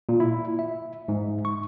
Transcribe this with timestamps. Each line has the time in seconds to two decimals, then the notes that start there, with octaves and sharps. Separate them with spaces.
0.09 A#2
0.20 E4
0.59 E5
1.08 G#2
1.45 C#6